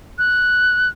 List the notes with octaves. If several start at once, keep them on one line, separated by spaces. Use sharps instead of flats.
F#6